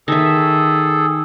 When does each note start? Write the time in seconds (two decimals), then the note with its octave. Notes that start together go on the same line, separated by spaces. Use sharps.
0.08 D#3 G#4 A4 E5